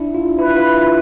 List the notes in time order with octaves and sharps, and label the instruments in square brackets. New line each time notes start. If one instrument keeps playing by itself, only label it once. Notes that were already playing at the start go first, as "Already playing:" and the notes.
Already playing: [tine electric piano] D4 E4
F4
[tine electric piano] E4 [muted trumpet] B4
[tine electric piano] F4
E4